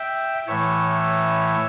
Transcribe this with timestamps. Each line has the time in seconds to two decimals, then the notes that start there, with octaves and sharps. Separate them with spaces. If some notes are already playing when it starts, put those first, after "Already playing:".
Already playing: E5 G5
0.47 A2 E3 A3 C#5 E5